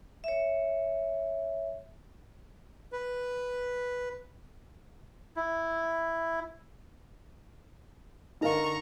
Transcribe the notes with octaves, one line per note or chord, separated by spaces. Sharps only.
C#5 E5
B4
E4
D3 D#4 A#4 F5 A#5 C#6